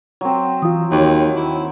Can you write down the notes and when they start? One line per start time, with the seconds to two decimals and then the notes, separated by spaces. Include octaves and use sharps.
0.21 F#3 C4
0.62 E3 F4 D#6
0.92 D#2 D#3 F#4 C#5 G5
1.36 E4